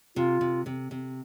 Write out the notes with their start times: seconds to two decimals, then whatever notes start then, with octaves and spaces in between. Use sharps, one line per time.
0.16 C3 F4
0.41 C3
0.66 C3
0.91 C3